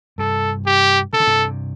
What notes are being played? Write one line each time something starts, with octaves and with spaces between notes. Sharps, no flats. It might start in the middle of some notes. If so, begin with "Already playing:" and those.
G2 C3 A4
G4
C3 A4
D3
G2 C3